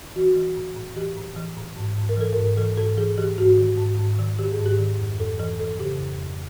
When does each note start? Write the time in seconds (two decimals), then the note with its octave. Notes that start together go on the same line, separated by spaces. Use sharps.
0.16 E3 F#4
0.35 E3
0.56 A2
0.76 A2
0.96 E3 G4
1.16 A2
1.36 E3
1.57 A2
1.76 G#2
1.97 G#2
2.09 A#4
2.17 E3 A4
2.33 G#2 A#4
2.57 E3 A4
2.77 G#2 A4
2.97 E3 G#4
3.18 E3 G4
3.38 G#2 F#4
3.58 D#3
3.78 G#2
3.99 G#2
4.18 D#3
4.39 D#3 G4
4.52 G#4
4.59 G#2
4.66 G4
4.79 D#3
4.99 F2
5.19 F2 A4
5.39 E3 A4
5.59 E3 A4
5.80 C#3 G4
6.00 F2
6.20 F2